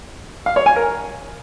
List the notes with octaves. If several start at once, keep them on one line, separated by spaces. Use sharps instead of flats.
F5
C#5
G#5
A#4